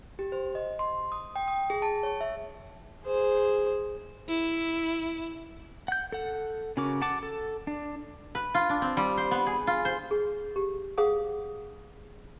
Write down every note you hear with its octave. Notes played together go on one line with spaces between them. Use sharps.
G4
C5
D#5
C6
D#6
G5
D#6
G#4
A5
C#5
E5
G#4 C5
E4
F#5 G6
A4 F#5
C#3 C#4 F#4 A#4 D6
F#5 A5 D6
A4
D4
B4
F4
D4
C4
G3
C5
B3
G#4
F4
C5
G#4
G4
G#4 C5 F5 F#5 D#6